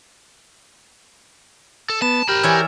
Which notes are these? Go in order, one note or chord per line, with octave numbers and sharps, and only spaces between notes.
A4
B3 A5 E7
G4 A#4 B5 F6
E3 C#5 D5 E6 G#6